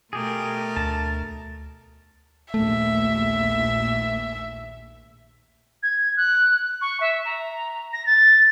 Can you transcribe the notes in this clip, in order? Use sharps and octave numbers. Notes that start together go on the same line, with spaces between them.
B2 A3 G4 G#4 A#4
D2 A5
A#1 D#2 A3 E5
G#6
F#6
C#6
E5
A#5
A#6
A6